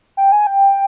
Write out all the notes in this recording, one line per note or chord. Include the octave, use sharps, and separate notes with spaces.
G5
G#5
G5